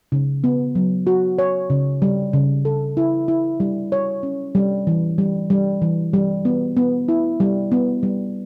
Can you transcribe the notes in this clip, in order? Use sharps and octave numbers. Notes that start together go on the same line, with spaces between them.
C#3
B3
F#3
F#4
C#5
C#3
G3
C#3
A4
E4
E4
G3
C#5
C#4
G3
E3
G3
G3
E3
G3
B3
B3
E4
G3
B3
G3